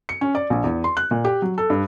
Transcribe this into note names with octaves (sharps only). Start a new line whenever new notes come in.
C#7
C#4
D5
A#1
E2
C6
F#6
A#2
G4
F#3
A4
G2